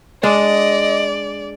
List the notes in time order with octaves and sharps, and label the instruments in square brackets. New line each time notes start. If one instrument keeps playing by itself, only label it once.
[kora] G#3 D4 [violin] D5 [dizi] D#5